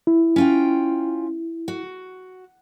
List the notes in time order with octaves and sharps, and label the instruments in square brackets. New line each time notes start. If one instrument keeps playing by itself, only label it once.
[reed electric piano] E4
[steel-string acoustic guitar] C#4 F4 G5
F#4